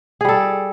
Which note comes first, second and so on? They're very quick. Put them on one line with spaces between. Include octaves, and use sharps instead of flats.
G#4 G3 A4